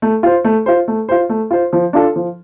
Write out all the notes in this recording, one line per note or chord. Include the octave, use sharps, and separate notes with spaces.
A3
F4 C5
A3
F4 C5
A3
F4 C5
A3
F4 C5
F3
D4 F4 A4
F3